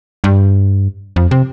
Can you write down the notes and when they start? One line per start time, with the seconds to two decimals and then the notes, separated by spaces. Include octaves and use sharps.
0.24 G2
1.16 F2
1.31 C3